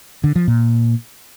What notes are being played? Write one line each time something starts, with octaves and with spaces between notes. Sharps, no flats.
D3
F3
A#2